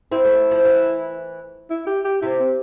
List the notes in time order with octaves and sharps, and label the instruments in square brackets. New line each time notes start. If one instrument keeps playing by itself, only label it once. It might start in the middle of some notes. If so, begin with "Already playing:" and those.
[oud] C4 [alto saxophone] E4
[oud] A3
F3
E3
[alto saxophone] E4
G4
G4
[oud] C3 [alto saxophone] E4
[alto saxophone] C4